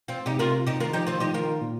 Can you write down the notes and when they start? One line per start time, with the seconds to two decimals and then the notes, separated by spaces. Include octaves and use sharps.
0.08 C4 F4
0.26 C3 D#4 G4
0.39 F4 A#4
0.66 D#4 G4
0.80 D#3 F4 A#4
0.93 F3 D#4 G4
1.07 D#3 C4 F4
1.20 F3 D#4 G4
1.34 D#3 F4 A#4
1.61 A#2